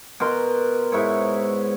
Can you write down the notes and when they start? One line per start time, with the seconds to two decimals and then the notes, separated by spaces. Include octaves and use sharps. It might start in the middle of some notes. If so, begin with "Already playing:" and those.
0.20 B2 A#4 C6
0.92 G#2 E4 C#5